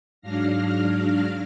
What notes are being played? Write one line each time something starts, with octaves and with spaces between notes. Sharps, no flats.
G#2 F#3 D4 F5 F6 A#6